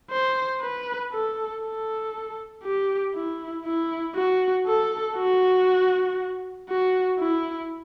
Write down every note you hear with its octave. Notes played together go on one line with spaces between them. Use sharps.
C5
B4
A4
A4
G4
E4
E4
F#4
A4
F#4
F#4
E4